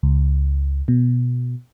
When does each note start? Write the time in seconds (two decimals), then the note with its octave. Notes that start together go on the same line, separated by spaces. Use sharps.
0.03 C#2
0.88 B2